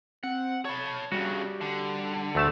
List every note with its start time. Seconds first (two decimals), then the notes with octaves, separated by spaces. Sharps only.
0.24 C4 F#5
0.65 C#5 A5 B5
1.12 G2 C#3 G3 F#4
1.61 D3
2.35 D2 A3 A5